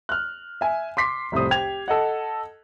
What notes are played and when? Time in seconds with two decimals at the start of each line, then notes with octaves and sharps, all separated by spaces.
0.09 F6 F#6
0.61 E5 G#5
0.97 C6 D6 B6 C7
1.32 F1 C2 A2 C4 C5 D#6
1.51 G4 G5 G#6 F7
1.88 A4 D#5 F#5